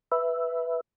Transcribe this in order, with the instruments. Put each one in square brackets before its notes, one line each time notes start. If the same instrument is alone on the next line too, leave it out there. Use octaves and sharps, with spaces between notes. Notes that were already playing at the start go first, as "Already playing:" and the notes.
[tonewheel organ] B4 E5